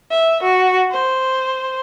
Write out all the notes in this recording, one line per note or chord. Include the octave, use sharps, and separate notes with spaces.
E5
F#4
C5